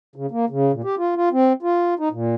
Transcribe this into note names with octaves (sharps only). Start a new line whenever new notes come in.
C#3
A#3
C#3
A#2
G4
F4
F4
C4
F4
D#4
A#2